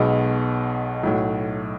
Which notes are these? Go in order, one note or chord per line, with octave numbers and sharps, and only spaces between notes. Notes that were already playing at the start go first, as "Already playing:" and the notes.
Already playing: B1 B2 G#3 B3
B1 A2 F#3